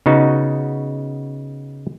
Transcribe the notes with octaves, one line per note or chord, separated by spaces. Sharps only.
C#3 B3 D#4 F#4